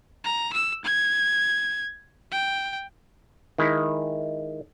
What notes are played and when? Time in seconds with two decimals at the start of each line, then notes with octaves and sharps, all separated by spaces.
0.24 A#5
0.53 E6
0.84 G#6
2.32 G5
3.58 D#3 G#3 E4